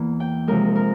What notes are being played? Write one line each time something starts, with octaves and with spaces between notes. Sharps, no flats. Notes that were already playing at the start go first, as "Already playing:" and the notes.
Already playing: E2 E3 A#3
G5
C3 F3 G#3 A#4
A#4